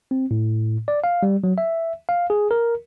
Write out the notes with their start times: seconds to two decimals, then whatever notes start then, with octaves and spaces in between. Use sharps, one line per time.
0.11 C4
0.31 A2
0.88 D5
1.04 F5
1.23 G3
1.44 F#3
1.58 E5
2.09 F5
2.30 G#4
2.51 A#4